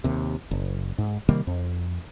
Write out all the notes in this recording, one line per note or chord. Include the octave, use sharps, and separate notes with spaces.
D#2 C3
F#1
G#2
C3 D#3 G3 A#3
F2